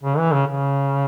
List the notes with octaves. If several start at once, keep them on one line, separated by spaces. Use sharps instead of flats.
C#3
E3
C#3
C#3